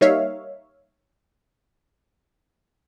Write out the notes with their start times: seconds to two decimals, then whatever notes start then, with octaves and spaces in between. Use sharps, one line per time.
0.01 G3 A#3 D#4 C#5 E5 F5